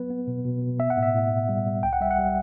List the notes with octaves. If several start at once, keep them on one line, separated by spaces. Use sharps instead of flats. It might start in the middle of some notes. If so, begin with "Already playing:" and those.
Already playing: F#3 B3 B4
B3
B2
B2
B2
B3 E5
F#5
A2
E5
A2
A2
G3
G3
C2 G5
F#5
G3 E5
F#5
G3